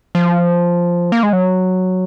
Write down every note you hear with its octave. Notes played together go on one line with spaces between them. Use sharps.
F3
A#3
G#3
F#3